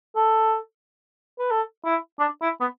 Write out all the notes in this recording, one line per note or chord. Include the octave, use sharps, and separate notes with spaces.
A4
B4
A4
E4
D4
E4
B3